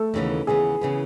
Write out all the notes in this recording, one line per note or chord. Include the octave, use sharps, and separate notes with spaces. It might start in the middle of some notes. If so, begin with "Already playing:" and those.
Already playing: A3 A4
D#2 C#3 E3 B3
D#2 C#3 E3 B3 G#4
C#3 E3 B3